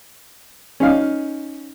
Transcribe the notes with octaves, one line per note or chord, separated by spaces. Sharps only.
C#4 D#4 F5